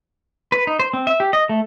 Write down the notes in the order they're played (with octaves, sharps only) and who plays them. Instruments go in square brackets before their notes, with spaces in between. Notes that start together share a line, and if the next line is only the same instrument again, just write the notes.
[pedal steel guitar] B4
D#4
C5
C4
E5
G4
D#5
A3